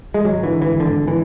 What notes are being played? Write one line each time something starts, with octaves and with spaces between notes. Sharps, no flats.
G#3
G#1 F#3
D3 E3
G#1 E3
G#1 D3
G#1
E3